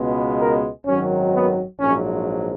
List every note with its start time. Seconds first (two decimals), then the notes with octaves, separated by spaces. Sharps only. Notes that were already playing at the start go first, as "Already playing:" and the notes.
Already playing: C#2 B2 G#3 B3
0.39 A#4
0.85 G#1 F#2 D#3 F#3 C#4
1.33 B3
1.80 A#1 G#2 F#3 C#4